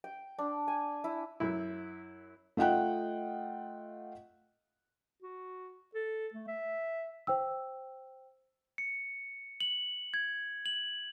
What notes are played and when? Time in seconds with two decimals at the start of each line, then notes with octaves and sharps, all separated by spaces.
0.04 G5
0.38 D4
0.68 G#5
1.04 E4
1.40 F#2 E4
2.57 A3 F4 D#5 F#5 G5 F#6
5.22 F#4
5.95 A4
6.34 A3
6.47 E5
7.27 C5 G5 E6
8.78 C#7
9.61 F#7
10.14 G#6
10.66 F#7